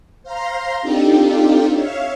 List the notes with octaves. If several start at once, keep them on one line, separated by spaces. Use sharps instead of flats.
C5 F5 A#5 C6
C4 D4 D#4 F4 G4 A4
C#5 E5 F5